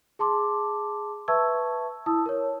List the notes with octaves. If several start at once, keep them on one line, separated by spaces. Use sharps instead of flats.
G#4 A5 C6 D6
B4 E5 A5 C#6 E6 G#6
E4 A5 D#6 E6
A#4 C#5